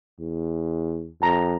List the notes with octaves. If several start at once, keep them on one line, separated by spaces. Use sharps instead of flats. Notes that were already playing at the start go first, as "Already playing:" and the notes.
E2
F2 A5 A#5